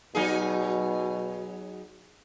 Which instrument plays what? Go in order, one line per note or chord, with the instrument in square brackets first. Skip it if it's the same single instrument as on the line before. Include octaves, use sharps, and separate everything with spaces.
[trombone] B2 [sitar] F#3 D#4 G#4